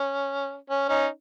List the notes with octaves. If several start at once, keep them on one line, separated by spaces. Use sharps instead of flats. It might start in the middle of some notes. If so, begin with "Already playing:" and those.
Already playing: C#4
C#4
C#4 D#4